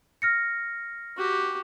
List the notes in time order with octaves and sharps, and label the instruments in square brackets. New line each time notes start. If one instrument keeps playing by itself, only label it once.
[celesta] F6 A#6 C#7
[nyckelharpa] F#4 G4